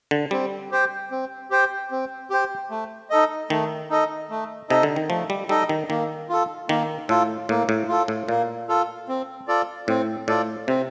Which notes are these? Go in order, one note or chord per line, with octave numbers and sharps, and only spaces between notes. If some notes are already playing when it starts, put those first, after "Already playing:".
D3
G3 C4
G4 C5 G5
C4
G4 C5 G5
C4
G4 C5 G5
A3
D#4 A4 D#5
D#3 A3
D#4 A4 D#5
A3
C3 D#4 A4 D#5
D3
D#3
F3 A3
G3
G3 D#4 A4 D#5
D#3
D#3 A#3
F4 A4
D#3 A#3
A2 F4 A4
A2 A#3
A2
F4 A4
A2
A#2 A#3
F4 A4
C4
F4 A4 D5
A2 C4
A2 F4 A4 D5
C3 C4